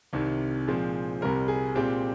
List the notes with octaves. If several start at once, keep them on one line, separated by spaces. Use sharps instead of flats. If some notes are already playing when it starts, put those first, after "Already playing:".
C2 C3 D#3
A#2 F3 G#3 C4
C2 C3 G3 C4 A#4
G#4
A#2 G#3 C4 G4